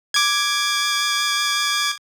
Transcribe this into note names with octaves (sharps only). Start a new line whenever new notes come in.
D6 G#6